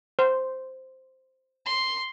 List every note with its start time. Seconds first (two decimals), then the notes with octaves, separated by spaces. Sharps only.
0.19 C5
1.66 C6